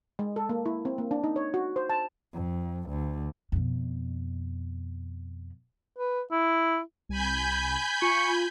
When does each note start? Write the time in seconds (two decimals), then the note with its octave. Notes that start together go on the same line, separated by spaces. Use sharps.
0.19 G#3
0.36 A4
0.49 A#3
0.66 E4
0.85 C4
0.98 A#3
1.11 D4
1.24 D#4
1.36 C#5
1.54 F#4
1.76 C5
1.89 A5
2.33 F2
2.90 D2
3.52 F2 B2
5.98 B4
6.31 E4
7.09 C2 G#5 B5 G6
8.02 F4 C#6